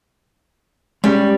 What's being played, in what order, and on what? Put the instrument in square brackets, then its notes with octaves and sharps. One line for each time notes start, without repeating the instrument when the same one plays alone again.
[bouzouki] G3 [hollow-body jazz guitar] G#3 C#4 C#5